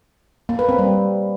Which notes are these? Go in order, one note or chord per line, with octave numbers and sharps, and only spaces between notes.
A#3
B4
C4
G3